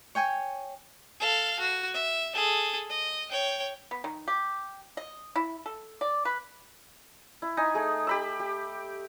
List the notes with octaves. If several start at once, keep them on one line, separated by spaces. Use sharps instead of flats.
C#5 G5 G#5 C#6
A4 F5
F#4
E5
G#4 A4
D#5
C#5 G5
B3
D#3
G4
D#5
E4
A4
D5
B4
E4
D#4 G#5
A3 G#4
G4 B5 E6
G4